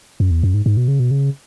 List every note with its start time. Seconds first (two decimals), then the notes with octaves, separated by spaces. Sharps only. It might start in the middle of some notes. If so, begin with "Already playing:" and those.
0.20 F#2
0.31 E2
0.43 F#2
0.54 G#2
0.66 G#2
0.77 B2
0.88 C#3
1.00 B2
1.11 C#3